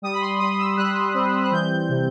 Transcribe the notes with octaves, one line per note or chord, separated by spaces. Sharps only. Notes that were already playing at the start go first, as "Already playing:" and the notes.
G3 D#6
B5
C6
G3 D#6
E6
G3 F#6
C4
F#6
E3 G6
C3